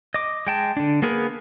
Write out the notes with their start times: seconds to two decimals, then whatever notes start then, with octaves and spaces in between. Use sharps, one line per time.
0.14 D#5 D6
0.47 G#3 G5 A5
0.77 D3 D4
1.02 A#3 B3 G#4 A#4 B4